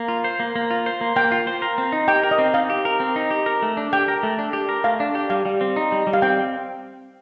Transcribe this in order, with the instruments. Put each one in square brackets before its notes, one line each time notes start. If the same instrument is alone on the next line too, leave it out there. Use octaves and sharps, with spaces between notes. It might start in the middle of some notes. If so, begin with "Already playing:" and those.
Already playing: [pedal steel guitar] A#3
F4
C5
A#3
A#3
F4
C5
A#3
[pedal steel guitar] A#3 [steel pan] G5
[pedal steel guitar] F4
C5
A#4
C4
D#4
[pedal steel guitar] G4 [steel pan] G5
[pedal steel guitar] A#4
[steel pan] D#5
[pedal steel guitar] C4
[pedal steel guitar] D#4 [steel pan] F5
[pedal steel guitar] G4
A#4
C4
D#4
G4
A#4
A3
D4
[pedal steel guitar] G4 [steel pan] G5
[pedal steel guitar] A#4
A3
D4
G4
A#4
[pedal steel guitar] A3 [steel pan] F5
[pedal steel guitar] D4
G4
[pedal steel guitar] G3 [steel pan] F5
[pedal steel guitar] G3
C4
D#4
G3
G3
[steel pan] F5
[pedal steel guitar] C4 [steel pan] G5